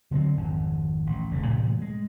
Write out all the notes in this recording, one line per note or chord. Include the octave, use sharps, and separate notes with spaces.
D3 F#3 A3 C4
G#1 F2
A1
F1 C#3 A3
A2 C3 E3 G#3
G#3